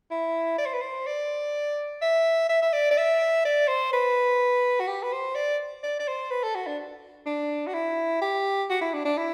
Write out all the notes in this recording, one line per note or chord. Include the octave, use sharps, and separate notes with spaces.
E4
D5
C5
B4
C5
D5
E5
E5
E5
D5
D5
E5
D5
C5
B4
F#4
G4
B4
C5
D5
D5
D5
C5
B4
A4
F#4
D4
D4
F#4
E4
G4
F#4
E4
D4
D4
E4